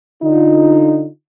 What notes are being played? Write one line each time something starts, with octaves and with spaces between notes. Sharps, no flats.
D3 D#4 F4